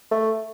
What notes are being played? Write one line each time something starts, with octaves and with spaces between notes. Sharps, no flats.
A3